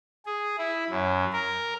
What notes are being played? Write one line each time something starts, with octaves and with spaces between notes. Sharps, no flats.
G#4
E4
F#2
A#4